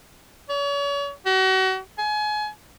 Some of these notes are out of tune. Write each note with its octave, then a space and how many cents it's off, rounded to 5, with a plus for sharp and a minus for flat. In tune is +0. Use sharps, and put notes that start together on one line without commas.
C#5 +40
F#4 +35
G#5 +30